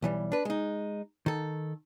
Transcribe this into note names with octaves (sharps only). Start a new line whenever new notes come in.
B1 E3 G3
D4 B4
G#3 D#4
D#3 A4